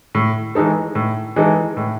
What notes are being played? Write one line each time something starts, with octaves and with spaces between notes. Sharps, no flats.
A2
E3 G#3 D#4 A4
A2
E3 G#3 D#4 A4
A2